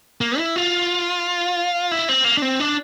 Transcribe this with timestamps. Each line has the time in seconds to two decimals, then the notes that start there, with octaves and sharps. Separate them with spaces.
0.21 A#3
0.38 E4
0.56 F4
1.91 E4
2.09 C4
2.25 A#3
2.37 D4
2.42 C4
2.60 D4